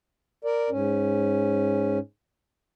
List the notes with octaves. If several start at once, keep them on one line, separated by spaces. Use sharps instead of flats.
A#4 D5
G#2 C#4